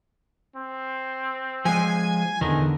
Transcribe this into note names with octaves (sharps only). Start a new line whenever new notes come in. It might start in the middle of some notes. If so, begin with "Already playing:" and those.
C4
F3 G#3 G#5
E2 D3 D#3 A#4